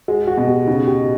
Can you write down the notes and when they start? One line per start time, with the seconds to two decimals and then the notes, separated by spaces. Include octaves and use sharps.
0.08 G#3 F#4
0.28 F#4
0.37 B2
0.48 G4
0.67 C#3 D#4
0.88 G4